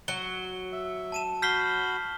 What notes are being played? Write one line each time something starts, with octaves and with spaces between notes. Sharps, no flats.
F#3 G7
E5
A5 D#7 E7
F#4 B5 F6 G6 B6 C7 G7